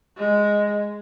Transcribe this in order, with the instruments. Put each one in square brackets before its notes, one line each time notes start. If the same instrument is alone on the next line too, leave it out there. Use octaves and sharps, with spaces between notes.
[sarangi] G#3